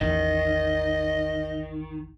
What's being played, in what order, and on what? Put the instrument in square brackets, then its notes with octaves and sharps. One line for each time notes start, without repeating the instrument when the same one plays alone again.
[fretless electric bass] A1 E2 [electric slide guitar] D#3 [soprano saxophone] D#5